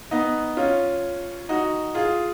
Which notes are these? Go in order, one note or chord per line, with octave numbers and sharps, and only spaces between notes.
B3 D#4
C#4 F4
D#4 F#4
F4 G#4